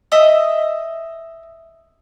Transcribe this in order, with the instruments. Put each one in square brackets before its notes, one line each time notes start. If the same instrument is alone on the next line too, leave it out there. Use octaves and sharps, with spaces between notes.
[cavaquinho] D#5 E5 D#6